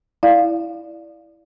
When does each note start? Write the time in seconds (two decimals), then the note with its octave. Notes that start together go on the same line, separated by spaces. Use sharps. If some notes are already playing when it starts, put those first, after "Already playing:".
0.23 E4 D5 F5